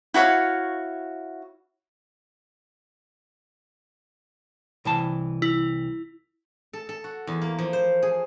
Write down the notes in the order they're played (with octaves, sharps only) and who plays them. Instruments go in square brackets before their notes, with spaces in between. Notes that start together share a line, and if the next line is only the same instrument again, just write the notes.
[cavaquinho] E4 F#4 C#5 F5
[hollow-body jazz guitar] C2 E3 A5
[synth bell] E4
[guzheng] A4
A4
F#4
E2
A#3
F3
C5
G#4